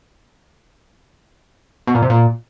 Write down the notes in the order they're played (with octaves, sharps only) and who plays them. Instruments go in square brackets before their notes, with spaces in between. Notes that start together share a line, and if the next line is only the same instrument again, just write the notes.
[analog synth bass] B2
A#2
C3
A#2